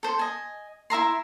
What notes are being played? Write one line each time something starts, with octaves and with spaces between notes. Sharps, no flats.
A4 C5
D#5 G#5
E4 E5 A#5 C6